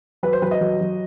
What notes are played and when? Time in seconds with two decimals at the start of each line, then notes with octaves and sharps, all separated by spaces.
0.23 F#3 B4
0.33 C5
0.42 F#3 B4
0.51 D#5
0.61 F#3
0.81 F#3